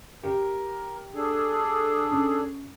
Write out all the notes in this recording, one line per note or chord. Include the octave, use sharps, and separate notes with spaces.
G4 A#4
D4 G#4 A4
C#4